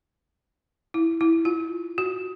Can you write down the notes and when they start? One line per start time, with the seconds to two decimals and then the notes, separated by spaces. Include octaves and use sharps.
0.94 E4
1.21 E4
1.45 F4
1.98 F#4